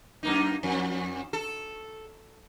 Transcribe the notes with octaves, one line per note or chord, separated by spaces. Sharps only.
F#2 A#3 D#4
F2
A4